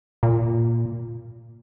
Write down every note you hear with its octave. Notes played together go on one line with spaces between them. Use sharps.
A#2